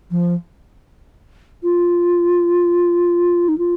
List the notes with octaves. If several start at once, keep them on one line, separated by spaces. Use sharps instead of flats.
F3
F4
D#4
F4